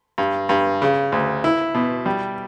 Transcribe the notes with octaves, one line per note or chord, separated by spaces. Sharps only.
G2
G2
C#3
D2
E4
B2
G3